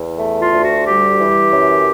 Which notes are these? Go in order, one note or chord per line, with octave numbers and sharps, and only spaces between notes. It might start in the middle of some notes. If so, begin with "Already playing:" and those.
Already playing: E2
A3
F4
D2
F#4
G3 G4
E3
F#2